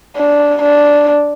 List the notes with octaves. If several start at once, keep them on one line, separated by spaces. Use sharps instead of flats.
D4
D4